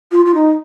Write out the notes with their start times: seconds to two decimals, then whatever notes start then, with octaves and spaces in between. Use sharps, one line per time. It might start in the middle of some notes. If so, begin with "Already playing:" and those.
0.12 F4
0.25 F4
0.35 D#4